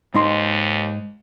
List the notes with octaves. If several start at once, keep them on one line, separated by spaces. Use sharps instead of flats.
D#2 G#2 D#4 C6